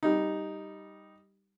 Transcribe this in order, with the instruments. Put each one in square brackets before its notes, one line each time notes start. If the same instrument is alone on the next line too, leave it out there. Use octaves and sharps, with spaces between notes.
[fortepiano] G3 D#4